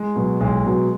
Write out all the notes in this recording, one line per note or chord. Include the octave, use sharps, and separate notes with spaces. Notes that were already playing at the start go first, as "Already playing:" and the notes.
Already playing: G#3
B2 F#3
B1 G#3
B2 F#3